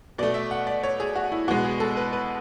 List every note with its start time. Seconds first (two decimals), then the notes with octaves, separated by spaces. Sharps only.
0.18 B2 A3 D5
0.34 E5
0.51 F#5
0.67 D5
0.84 C#5
1.00 G#4
1.16 F#4
1.32 E4
1.48 B2 G#3 B3 F#4
1.64 G#4
1.80 A4
1.97 B4
2.13 B4